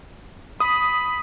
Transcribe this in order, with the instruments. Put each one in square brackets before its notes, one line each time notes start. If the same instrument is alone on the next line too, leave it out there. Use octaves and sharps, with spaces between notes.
[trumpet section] B5 [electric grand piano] D#6